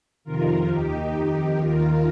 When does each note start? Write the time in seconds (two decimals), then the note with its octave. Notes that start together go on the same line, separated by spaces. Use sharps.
0.24 F2 C3 D#3 F4 A#4
0.69 D#2 D#3 D#4 G4
1.13 F2 D#3
1.57 D#2 D#3 F4 A#4